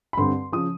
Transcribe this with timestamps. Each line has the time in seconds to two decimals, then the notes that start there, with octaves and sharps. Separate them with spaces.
0.13 B5
0.17 G2 D3 G3 C4 C6
0.52 C#3 F3 D#6